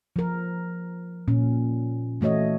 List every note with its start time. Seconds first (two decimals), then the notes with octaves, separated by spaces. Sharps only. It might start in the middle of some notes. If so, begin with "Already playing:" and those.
0.16 F3 A#4
1.28 A#2 C#4
2.21 E3 A3 F#4 C#5 D#5